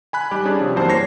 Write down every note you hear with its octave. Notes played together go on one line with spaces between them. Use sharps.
G#5 B5 F#6
G3 D#4 G4
C#4 D4 G#4
C3 F3
G2 E3 F#3 A#3 C5 A5
C#5 A#6 C7